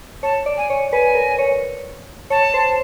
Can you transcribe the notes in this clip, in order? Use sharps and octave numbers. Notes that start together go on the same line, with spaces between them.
C#5 A5
D5
G#5
C#5
B4 G#5
A#4
C#5
C#5 A5
C5